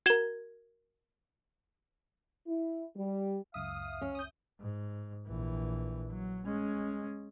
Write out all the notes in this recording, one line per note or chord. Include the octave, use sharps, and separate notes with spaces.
F#4 A#4 G#6 E7 G7
E4
G3
C#2 F#2 E5 F5 D#6
C#4
D#6 G6
G#2
A#1 E3
F#3
G#3 C#4